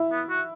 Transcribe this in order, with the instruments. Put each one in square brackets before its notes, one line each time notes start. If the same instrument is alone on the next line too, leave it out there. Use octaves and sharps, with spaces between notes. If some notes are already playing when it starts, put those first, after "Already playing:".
Already playing: [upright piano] E4
[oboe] B3
F#4